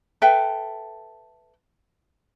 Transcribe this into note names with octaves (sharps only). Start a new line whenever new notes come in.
A4 B4 E5 G5